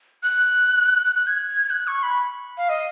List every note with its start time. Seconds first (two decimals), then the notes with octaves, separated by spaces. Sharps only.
0.23 F#6
1.05 F#6
1.16 F#6
1.27 G#6
1.70 F#6
1.87 C#6
2.03 B5
2.57 F5
2.69 D#5